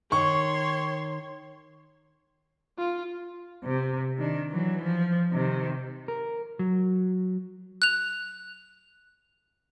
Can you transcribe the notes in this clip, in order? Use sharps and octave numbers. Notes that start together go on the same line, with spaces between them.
D#3 C#5 C6 C#6
F4
C3
D#3 D4
E3 F#3
F3
C3 D#3
A#4
F#3
F#6 F7